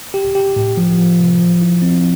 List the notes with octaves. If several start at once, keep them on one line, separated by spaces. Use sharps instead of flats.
G4
G4
A2
F3
F3
C3
F3
E4
C4